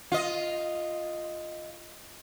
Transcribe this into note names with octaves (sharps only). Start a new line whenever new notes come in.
F4 D#5